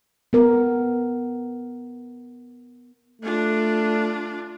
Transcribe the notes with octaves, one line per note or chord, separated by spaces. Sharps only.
B3 A#4
A3 D4 F4